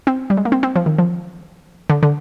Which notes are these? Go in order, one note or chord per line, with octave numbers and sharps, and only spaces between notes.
C4
G3
G#3
A#3
C4
C4
F3
D#3
F3
D3
D3